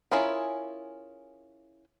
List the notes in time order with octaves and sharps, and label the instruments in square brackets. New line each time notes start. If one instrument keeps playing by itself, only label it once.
[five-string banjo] C#4 E4 F4 G#4 A#4